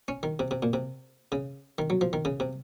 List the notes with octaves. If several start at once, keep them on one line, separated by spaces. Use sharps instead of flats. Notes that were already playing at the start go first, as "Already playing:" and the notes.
C#4
D#3
C3
C3
A#2
C3
C#3
D#3
F#3
F3
D#3
C#3
C3